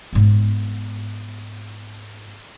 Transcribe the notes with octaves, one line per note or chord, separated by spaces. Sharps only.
G#2 B3